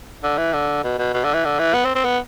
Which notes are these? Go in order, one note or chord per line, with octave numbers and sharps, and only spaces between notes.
D3
E3
D3
B2
B2
B2
D3
E3
D3
E3
B3
C4
C4
B3